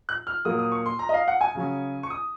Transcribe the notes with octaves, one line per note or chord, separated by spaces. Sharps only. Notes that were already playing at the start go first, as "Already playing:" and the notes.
F#6
F6
A#2 F#3 A#3 D#6
D#6
C#6
C6
A#5
D#5
F5
F#5
G#5
C#3 F#3 C#4
C#6
D#6